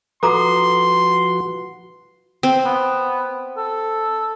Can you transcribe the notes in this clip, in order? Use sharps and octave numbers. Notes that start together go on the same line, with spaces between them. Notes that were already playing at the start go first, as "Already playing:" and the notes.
F3 F#4 A4 B4 A#5 C6 D6
C4
B3
A4